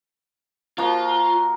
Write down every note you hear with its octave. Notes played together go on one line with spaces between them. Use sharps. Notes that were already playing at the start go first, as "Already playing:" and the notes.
F3 A#3 F4 F#4